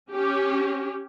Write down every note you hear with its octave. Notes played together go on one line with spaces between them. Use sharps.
C#4 G4